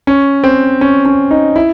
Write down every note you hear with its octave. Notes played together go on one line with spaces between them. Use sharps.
C#4
C4
C#4
C#4
D#4
E4